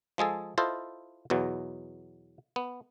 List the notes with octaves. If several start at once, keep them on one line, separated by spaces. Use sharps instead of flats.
F3 G#3 G#4 A4
E4 F4 A4 C5 D#5
E2 B2 E3 F#3
B3